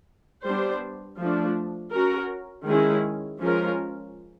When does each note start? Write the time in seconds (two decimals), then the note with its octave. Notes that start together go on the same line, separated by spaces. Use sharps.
0.44 G3 B3 D4 G4 C5
1.19 F3 A3 D4
1.93 C#4 F#4 A#4
2.67 D#3 G#3 C#4 E4 G#4
3.41 F3 G#3 C#4 F4 A#4